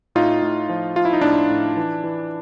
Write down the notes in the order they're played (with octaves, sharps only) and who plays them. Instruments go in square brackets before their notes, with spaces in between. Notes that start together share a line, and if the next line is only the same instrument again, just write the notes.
[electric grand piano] A2 D#4 F4
A2
F3
F3 F4
E4
D#4
A2 D4 E4
A2
E3
E3